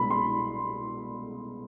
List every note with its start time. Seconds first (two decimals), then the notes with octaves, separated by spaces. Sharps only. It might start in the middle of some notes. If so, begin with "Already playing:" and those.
Already playing: C2 B2 G#3 B3 B5
0.10 C6